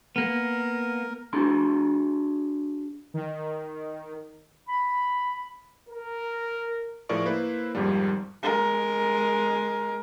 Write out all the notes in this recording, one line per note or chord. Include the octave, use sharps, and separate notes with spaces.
A#3 B3 A#4
D4 F#4 G#4 C6
D#3
B5
A#4
A2 F3 G#4 A#4 D5 C#6
A#3 E4 B4 C5
G#1 F2 G#2 F3 G3
G#3 A#4